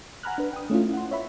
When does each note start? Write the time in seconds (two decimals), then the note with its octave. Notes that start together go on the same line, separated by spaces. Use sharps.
0.23 F#5 G#5 A#5 B5 F6 F#6
0.38 D4 B4
0.53 G5 D#6
0.70 A3 C#4 E4 F4
0.93 F#5 C6
1.11 C#5 E5 B5